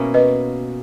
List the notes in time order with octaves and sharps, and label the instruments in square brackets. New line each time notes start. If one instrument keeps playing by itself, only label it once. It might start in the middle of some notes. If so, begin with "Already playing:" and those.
Already playing: [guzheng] B2 A#3 C#4 E4
[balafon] B4 D#5